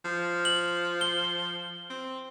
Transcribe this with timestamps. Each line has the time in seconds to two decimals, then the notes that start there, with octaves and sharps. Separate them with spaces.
0.05 F3
0.45 F#7
1.01 G7
1.90 C4